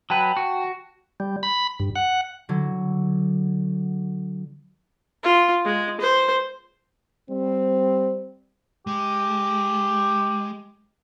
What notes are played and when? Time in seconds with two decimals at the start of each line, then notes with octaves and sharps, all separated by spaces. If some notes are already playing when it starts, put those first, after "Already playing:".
0.10 F#3 B4 G5 A5
0.37 F#4
1.20 G3
1.43 B5
1.80 G2
1.95 F#5
2.49 D3 F#3
5.24 F4
5.65 G#3
6.00 C5
7.30 G3 C4
8.87 G#3 G4